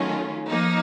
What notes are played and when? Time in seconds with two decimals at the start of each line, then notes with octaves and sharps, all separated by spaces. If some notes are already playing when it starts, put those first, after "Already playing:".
Already playing: D#3 F#3 A3 C#4 F4
0.48 F3 A#3 D#4